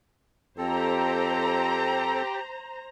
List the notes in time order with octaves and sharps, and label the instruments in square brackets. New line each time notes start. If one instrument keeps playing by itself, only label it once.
[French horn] F2 [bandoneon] C4 A4 [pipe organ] G4 [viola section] C5 A#5